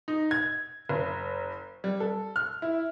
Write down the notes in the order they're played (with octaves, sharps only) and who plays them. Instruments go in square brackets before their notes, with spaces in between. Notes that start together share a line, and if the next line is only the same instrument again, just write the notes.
[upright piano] D#4
G#6
F#1
G3
A4
F6
E4